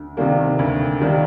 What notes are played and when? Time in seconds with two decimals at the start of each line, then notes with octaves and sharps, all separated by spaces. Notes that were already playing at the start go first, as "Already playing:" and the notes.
Already playing: D2
0.17 C3 D#3 G3 A#3
0.59 D2
1.01 C3 D#3 G3 A#3